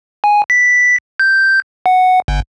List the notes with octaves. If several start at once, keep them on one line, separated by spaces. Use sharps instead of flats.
G#5
B6
G6
F#5
G1